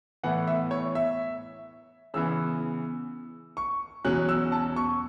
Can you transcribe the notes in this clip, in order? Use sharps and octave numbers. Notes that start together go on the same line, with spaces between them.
A2 E3 B3 F#5
E5
C#5
E5
C#3 E3 B3 E6
C#6
E2 B2 F#3 C#4 F#6
E6
A5
C#6